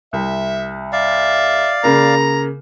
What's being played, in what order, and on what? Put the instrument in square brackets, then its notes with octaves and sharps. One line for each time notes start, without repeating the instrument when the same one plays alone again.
[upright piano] C2 [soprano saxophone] E5
[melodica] D5 F5 [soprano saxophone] E5
[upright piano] C#3 A#3 [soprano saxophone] A#5